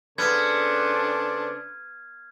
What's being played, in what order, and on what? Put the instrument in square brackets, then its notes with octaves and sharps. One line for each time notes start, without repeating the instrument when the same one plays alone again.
[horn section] C#3 A4 C5 [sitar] B3 [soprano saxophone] D4 [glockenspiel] F6 G#6